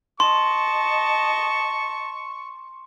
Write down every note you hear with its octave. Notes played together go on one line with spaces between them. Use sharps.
D#5 A5 C6 C#6